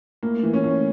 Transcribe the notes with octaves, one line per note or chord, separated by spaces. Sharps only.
A2 A#3
E3
C#4
A2